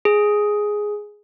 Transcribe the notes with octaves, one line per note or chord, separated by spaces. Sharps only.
G#4